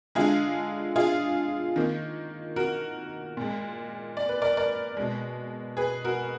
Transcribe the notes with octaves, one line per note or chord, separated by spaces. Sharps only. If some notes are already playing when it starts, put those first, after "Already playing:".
D3 G#3 F4 G#4
F4 G#4
D#3 A#3
F#4 A#4
A#2 G#3
D5
B4
A#4 D5
A#4 D5
B2 G#3
G#4 B4
F#4 A#4